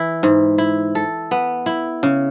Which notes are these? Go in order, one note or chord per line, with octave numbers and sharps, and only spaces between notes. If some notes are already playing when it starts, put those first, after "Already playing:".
Already playing: E3 E4
G#2
E4
A4
B3
E4
C#3